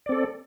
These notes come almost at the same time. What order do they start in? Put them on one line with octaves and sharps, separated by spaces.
D5 C4 A4